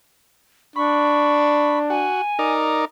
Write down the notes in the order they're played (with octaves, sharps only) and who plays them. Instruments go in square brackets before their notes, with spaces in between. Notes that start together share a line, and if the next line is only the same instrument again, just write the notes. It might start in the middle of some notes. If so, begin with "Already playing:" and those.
[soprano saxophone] D4 [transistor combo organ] B5 [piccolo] C#6
[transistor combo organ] F#4 [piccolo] G#5
[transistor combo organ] D#4 A#4 D5